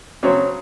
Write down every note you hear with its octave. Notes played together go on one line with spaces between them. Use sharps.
C#3 F#3 C4 C#5